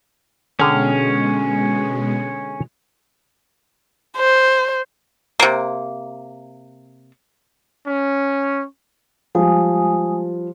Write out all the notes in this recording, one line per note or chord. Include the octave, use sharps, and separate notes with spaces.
B2 D3 G#3 C#4 G#4 G5 F6
C5
C3 A#3
C#4
F3 G3 G#3 G#5 D#6